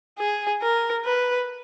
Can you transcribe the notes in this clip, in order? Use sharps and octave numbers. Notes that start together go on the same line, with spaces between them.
G#4
A#4
B4